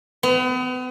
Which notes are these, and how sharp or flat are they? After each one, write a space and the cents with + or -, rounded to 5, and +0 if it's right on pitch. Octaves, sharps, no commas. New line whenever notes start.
B3 +40